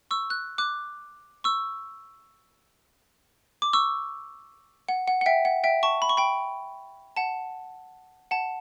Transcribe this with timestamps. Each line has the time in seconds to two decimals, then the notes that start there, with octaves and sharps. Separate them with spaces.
0.11 C#6 E6
0.30 F#6
0.58 D6 F#6
1.44 C#6 E6
3.62 D6
3.73 C#6 E6
4.88 F#5
5.08 F#5
5.21 F#5
5.26 E5 G5
5.45 F#5
5.64 E5 G5
5.83 A5 C#6
6.02 B5
6.09 C#6
6.17 G5 B5
7.17 F#5 A5
8.31 F#5 A5